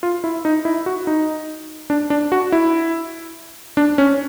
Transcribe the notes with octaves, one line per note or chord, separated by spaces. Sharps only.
F4
E4
D#4
E4
F#4
D#4
D4
D4
F#4
E4
D4
C#4